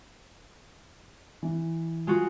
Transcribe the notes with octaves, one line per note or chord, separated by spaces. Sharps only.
E3
G#3 F4 F#4